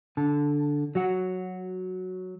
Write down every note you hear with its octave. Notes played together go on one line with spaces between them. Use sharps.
D3 A5
F#3 F#4 F#5